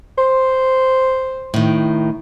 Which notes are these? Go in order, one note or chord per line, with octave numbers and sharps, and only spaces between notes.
C5
A2 D#3